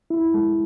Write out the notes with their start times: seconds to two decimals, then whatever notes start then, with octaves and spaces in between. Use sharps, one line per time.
0.10 E4
0.34 G#3